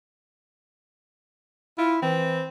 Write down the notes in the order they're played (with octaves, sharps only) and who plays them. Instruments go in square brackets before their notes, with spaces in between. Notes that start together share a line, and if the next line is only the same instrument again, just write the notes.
[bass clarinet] E4 [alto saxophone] F4
[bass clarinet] E3 [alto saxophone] C4